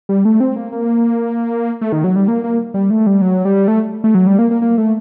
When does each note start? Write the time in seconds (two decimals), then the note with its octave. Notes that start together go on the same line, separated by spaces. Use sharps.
0.09 G3
0.25 A3
0.40 C4
0.56 A#3
0.72 A#3
1.81 A3
1.92 D#3
2.04 F#3
2.16 G3
2.28 A#3
2.44 A#3
2.74 G3
2.90 A3
3.07 G3
3.22 F#3
3.45 G3
3.68 A3
4.04 A3
4.15 F#3
4.27 G3
4.39 A#3
4.51 A#3
4.62 A#3
4.78 A3